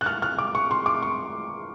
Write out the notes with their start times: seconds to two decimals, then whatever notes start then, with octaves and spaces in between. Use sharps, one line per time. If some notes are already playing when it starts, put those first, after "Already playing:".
0.01 F#6
0.06 F6
0.22 F6
0.39 D6
0.55 C#6
0.71 C6
0.86 D6
1.02 C#6